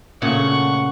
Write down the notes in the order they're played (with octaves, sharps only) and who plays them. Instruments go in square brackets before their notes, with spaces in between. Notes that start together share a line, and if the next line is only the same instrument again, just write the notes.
[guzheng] A#2 C#3 A3 [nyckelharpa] F#5 C#6